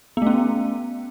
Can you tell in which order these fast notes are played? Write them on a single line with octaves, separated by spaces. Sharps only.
B3 A3 C#4